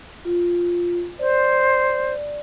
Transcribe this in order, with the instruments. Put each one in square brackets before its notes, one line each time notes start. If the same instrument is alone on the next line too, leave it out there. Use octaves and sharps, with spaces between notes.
[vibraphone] F4
[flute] C5 [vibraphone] D5